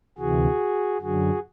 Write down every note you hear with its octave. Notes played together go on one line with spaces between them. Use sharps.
D2 C3 E3 F#4 G#4
F#2 D3 F#3 F#4 G#4